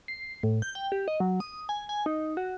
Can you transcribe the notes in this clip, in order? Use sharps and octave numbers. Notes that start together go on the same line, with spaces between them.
C7
A2
G6
G5
G4
D#5
F#3
D#6
G#5
G#5
D#4
F#4